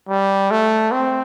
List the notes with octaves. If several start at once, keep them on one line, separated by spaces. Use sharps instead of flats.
G3
A3
C4